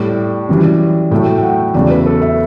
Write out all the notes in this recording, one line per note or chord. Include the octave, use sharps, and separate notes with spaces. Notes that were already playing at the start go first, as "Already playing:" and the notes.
Already playing: A2 G3
F#2 E3 G3
A2 F#3 A3 G5
G5
F#5
E2 C#3 F#3 A3 D5
B4
A4
E5